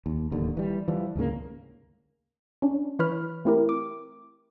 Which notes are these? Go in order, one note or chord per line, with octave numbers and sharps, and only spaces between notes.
D#2
D1 D#2 D3
E3 G3
E3 F3 G3
D2 G#2 C#3 A#3
C#4 D4
E3 B4 C#5 B5 F6
A3 C4 E4 G4 A#4
D6